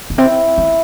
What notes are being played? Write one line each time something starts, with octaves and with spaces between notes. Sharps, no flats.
A#3
C4 E4
G#3